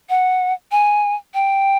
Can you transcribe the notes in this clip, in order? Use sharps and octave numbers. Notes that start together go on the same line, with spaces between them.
F#5
G#5
G5